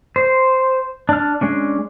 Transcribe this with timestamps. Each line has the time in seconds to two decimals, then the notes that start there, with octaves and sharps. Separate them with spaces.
0.16 C5
1.09 D4 F6
1.41 G#3 C#4 D4